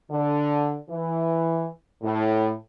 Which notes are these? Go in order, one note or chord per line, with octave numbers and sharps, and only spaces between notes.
D3
E3
A2